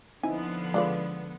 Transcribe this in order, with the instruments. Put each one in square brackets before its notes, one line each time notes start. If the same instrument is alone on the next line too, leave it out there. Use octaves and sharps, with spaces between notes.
[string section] D3 F3 B3 [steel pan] C4 D#4 E4 [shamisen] G#5
[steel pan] G#3 A4 B4 [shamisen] D4 F4 D5